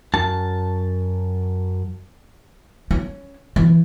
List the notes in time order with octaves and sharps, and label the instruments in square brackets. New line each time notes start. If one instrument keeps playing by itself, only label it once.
[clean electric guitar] F#2 A5
[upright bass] C#4
E3